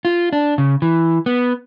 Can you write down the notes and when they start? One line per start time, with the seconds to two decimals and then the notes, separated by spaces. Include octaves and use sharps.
0.05 F4
0.33 D4
0.58 C#3
0.82 E3
1.26 B3